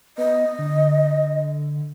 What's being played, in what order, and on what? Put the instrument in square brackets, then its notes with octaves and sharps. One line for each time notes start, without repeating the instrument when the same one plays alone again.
[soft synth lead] B3 [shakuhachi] D#5
[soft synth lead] D3